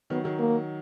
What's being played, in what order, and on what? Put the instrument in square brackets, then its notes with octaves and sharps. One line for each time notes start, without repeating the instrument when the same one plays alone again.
[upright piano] D#3 F#3 [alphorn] B3
[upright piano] D#3 F#3
[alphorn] A#3